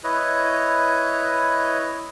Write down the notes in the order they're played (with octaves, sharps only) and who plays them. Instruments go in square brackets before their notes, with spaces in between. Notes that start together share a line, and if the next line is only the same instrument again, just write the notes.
[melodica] E4 B4 C#5 D#5